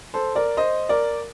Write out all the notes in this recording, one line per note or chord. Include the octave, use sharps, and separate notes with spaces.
A4 C5
A#4 D5
C5 D#5
A#4 D5